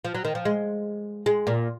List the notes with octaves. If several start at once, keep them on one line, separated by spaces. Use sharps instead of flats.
F3
F#3
D#3
F3
G#3
G#3
A#2